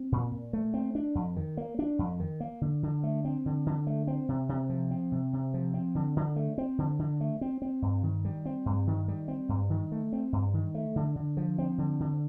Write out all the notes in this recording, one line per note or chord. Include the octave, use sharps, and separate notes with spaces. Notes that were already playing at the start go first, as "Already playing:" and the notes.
Already playing: C4
A#2
A#2
A3
C4
D4
F2
D#3
A#3
D4
F2
D#3
A#3
D3
D3
A3
C4
D3
D3
A3
C4
C3
C3
F3
C4
C3
C3
F3
C4
D3
D3
A3
C4
D3
D3
A3
C4
C4
G2
D#3
G3
C4
G2
D#3
G3
C4
G2
D#3
A3
C4
G2
D#3
A3
D3
D3
F3
C4
D3
D3